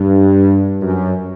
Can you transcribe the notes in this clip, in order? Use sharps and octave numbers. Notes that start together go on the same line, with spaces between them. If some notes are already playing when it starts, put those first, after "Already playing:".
Already playing: G2
F#2